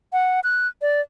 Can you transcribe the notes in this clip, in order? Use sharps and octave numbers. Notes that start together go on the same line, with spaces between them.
F#5
F#6
D5